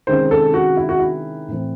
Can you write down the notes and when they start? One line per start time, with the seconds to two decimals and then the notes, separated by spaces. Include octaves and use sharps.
0.07 C3 D#3 G#3 C#4 C5
0.31 A4
0.54 F#4
0.77 E4
0.89 F#4
0.99 E4
1.48 A2 E3 C4